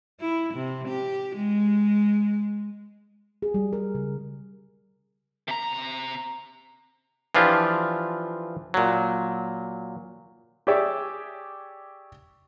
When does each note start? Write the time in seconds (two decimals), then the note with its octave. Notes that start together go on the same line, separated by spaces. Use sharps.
0.20 E4
0.54 C3
0.88 G4
1.35 G#3
3.42 G#4
3.54 G3
3.73 A#4
3.95 C#3
5.48 C3 A#5
7.35 E3 F3 D4 F4 G4
8.74 A#2 F#3
10.67 G4 G#4 C#5 D5 E5